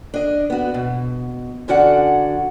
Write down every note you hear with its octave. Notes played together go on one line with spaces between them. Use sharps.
D4 D#5
B3 F#4
B2
D3 C#4 F#4 D5 F#5